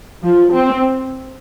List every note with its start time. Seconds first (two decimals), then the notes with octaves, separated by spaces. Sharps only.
0.23 F3
0.52 C4